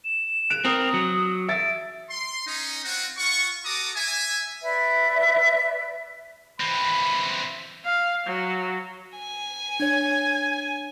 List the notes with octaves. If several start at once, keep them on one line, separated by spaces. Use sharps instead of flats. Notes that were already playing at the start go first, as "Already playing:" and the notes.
E7
F#6 D7 F7
C4 A#4 D#6
F#3
E5 A6 D7
C6
C#4 D#4
C4 F4 F#4
F4 F#5 C#6
F#4 A4 A#5 D6 D#6
E5 G#5
B4 D5 E5
E3 C4 B5
F5
F#3
G#5
D4 C#5 G#6